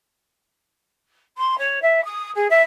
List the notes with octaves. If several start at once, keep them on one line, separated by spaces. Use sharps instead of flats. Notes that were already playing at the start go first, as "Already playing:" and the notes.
C6
C#5
E5
D#6
G#4
E5